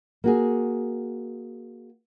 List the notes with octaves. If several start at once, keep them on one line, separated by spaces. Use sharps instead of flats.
A#3 F#4 G#4